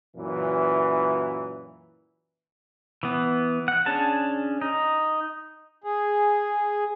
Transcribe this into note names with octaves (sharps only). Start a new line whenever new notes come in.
F#2 A#2 E3
E3 B3
F#5
C#4 D4 G#4 A5
D#4
G#4